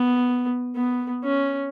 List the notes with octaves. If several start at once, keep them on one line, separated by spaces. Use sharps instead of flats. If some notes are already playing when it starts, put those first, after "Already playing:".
Already playing: B3
B3
C#4